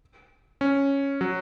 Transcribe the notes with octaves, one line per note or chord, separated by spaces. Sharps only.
C#4
F#3